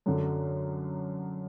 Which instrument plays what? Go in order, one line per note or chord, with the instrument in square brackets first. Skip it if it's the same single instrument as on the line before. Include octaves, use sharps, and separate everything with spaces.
[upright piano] F#2 D3 F#3